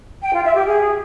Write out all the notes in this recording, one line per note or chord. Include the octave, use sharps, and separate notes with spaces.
G5
F4
E5
G4
G#4